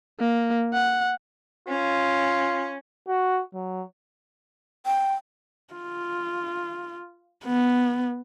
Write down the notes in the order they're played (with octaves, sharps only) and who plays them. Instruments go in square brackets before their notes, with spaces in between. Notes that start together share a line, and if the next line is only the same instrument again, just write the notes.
[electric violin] A#3
F#5
[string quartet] C#4 [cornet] F4
[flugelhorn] F#4
F#3
[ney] G5
[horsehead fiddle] F4
B3